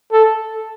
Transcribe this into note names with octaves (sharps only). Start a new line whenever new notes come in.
A4